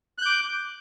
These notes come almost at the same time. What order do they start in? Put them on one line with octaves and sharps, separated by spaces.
F#6 G6 D6